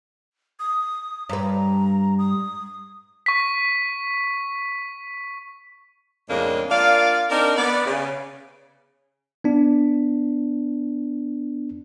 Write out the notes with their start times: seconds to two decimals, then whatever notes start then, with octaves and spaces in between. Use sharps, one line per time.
0.60 D#6
1.29 G2 B4 A#5
2.19 D#6
3.26 C#6 B6
6.28 F2 A2 C#3 G#3 A#3 D4
6.70 A#3 D4 F4 D5 F5
7.30 C4 D4 D#4 A#4
7.56 B3 D5
7.86 C#3
9.44 B3 D4